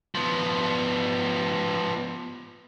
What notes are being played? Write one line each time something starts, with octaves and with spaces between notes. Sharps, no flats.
F3 B3